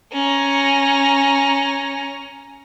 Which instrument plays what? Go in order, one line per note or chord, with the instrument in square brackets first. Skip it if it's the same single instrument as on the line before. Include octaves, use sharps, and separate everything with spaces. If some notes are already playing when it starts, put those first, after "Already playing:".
[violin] C#4 A#5